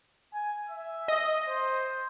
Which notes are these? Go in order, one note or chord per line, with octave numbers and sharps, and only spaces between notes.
G#5
E5
D#5
C5